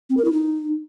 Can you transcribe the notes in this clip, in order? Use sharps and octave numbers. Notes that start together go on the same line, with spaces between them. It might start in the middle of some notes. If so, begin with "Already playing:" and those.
C4
A#4
E4
D#4